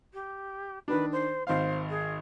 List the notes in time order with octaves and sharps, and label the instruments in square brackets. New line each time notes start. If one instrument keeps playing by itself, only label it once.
[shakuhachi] G4
[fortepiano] D#3 D4 [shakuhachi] B4
[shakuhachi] C5
[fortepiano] G#1 F5 [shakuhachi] C5
[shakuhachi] G#4